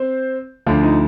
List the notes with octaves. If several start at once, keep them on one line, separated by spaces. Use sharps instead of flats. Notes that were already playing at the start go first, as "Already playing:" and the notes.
Already playing: C4 C5
D2 D3 F3 F4
D#4